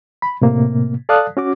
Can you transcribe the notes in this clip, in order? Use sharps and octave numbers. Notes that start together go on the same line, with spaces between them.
B5
A2 C3 A#3
A4 D5 F5 A5 D#6 F#6
C#4 F#4 D6